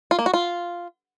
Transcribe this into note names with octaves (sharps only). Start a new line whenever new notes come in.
F4
A#3
F#4
F4